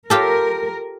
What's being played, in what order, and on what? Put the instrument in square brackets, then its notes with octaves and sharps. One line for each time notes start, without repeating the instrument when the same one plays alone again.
[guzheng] F4 G4 A4 [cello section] A#4